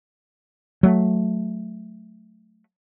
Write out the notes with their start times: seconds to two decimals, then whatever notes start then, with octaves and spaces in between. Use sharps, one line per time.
0.83 F#3 A3